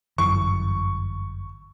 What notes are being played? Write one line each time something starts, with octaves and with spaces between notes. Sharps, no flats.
G1 F#2 E3 C#6